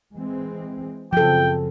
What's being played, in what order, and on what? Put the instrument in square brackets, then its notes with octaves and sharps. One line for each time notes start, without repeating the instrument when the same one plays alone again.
[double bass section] E3 G#3 C4
[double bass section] F#2 C#3 C4 [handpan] F3 A4 [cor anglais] G5